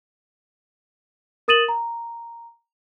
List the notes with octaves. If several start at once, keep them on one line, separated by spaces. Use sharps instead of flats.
A#4 D#6 A6 D#7 E7 F#7
A#5